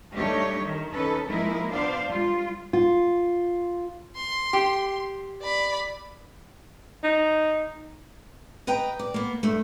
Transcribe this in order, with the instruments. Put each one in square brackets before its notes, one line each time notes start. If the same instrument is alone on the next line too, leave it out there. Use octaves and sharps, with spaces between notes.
[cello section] G3 A3 D4 D#4 G4 C#5
D#3
C#4 D#4 A4 B4
F3 G#3 A#3 D#4 E4 A#4
B3 D4 C5 D5 F5
G3 F4
[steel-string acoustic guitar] F4
[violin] C6
[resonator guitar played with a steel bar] G4
[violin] D5 B5
[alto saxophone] D#4
[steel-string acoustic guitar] B4 D#5 G5 A#5
D5
A#3 B3
G2 A3